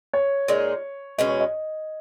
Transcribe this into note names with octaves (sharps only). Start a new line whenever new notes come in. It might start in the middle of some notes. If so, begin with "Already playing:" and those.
C#5
A#2 G#3 D#4
B2 G#3 C#4 D#5
C#5
D#5